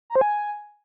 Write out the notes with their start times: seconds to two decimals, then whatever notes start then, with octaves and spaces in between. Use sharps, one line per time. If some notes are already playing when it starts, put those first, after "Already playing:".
0.10 A#5
0.16 C5
0.21 G#5